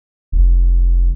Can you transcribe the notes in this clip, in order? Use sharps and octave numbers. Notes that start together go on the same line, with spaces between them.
F1